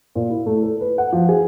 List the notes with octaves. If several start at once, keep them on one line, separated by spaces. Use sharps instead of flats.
A#2
E4
A3
A4
B4
F#5
F3
G#4